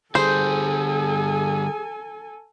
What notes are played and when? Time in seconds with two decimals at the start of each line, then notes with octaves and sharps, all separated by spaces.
0.15 D3 G3 G#4 A4 C5 G#5